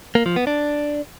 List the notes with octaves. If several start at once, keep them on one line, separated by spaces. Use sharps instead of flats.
A#3
F3
B3
D4